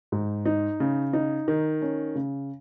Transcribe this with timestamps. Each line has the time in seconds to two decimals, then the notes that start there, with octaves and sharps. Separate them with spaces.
0.12 G#2
0.46 D#4
0.80 C#3
1.13 D#4
1.48 D#3
1.82 C#4
2.15 C#3